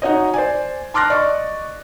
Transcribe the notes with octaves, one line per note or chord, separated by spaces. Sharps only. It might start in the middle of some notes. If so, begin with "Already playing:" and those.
D#4 F#4 C#5 D#5
C5 D5 G#5
A5 C6 D6 F6 F#6 A#6
D5 D#5 C#6